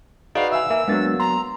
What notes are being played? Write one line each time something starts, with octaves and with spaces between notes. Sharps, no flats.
D#4 F#4 G#4 B4 D5 F5
E5 F5 G#5 E6
A#3 E5 G#5
F#3 G#3 A#3 B3 D4 A6
A#5 C6